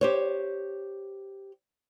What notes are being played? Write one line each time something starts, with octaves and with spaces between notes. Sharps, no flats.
G4 C5 C#5